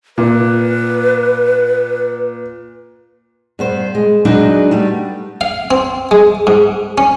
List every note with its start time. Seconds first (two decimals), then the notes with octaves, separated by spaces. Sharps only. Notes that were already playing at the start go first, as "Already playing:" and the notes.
0.18 A#2 B4
3.59 G2 B3 C5
3.95 G#3
4.25 F#3 G#3 D4 D#4 B4
4.71 G3 A3
5.41 F5
5.71 C4
6.11 G#3
6.47 G#2
6.98 C#4